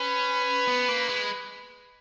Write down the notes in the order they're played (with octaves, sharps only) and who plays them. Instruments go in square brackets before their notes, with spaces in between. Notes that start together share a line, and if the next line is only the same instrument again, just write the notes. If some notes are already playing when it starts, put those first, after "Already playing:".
Already playing: [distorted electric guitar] C#4 [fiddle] B4
[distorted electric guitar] B3
A#3
G#3